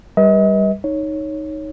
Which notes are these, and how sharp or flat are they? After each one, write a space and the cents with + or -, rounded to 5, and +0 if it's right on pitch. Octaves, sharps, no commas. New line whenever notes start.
G3 +0 B4 -35 D#5 +40
D#4 +0 C#5 +0